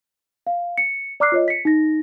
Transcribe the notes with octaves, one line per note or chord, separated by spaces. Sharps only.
F5
C#7
D5 A#5 D6 F6 F#6 C7
F4 C#5 D#5
B6 C#7
D#4 A#6